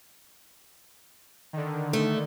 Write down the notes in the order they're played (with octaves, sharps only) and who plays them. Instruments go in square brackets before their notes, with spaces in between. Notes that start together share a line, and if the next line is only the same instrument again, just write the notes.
[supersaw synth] D3 D#3
[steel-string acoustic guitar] A3